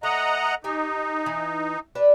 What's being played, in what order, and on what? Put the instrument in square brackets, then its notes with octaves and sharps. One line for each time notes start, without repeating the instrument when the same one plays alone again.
[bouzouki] A3 [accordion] D#5 F#5 A#5
[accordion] D#4 [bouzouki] G4 G#5
[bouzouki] E3
D4 G4 B4